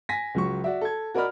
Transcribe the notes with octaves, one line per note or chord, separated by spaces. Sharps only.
G#5 A#6 B6
C#2 F#3 C#6
F#4 D5 E5
A4 G#6
F#4 A#4 D5 D#5 B5 F6